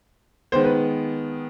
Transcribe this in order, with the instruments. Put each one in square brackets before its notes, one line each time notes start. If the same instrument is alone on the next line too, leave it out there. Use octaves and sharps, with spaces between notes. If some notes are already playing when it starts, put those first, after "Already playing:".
[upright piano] D#3 G#3 B3 [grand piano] C5
[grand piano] B4